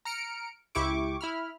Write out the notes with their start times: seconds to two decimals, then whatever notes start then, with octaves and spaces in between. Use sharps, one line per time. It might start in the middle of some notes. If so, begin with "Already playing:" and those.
0.05 A#5 F6 C#7 D7
0.75 C#2 E4 G4 C#6 D6
1.21 E4 B5 F6